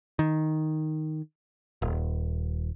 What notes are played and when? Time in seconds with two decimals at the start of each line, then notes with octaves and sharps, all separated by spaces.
0.19 D#3
1.82 D#1